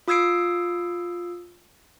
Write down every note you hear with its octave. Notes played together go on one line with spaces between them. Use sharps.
F4 D#6 E6 G#6 C7 D7